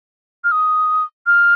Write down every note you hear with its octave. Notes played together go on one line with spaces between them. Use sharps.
F6
D#6
F6